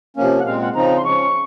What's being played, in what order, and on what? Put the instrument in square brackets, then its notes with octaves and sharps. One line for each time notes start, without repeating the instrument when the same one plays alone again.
[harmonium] C3 F3 A#3 C#4
[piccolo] F#5
[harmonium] A#2 G#3 C4 [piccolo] F5
[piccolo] F#5
[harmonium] C#3 F3 C4 D#4 [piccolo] A#5
[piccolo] C6
[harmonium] F3 G#3 C#4 [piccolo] C#6